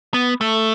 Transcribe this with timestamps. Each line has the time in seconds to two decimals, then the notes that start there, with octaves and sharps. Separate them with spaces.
0.14 B3
0.41 A3